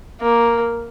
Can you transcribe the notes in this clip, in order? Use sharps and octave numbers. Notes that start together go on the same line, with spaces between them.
A#3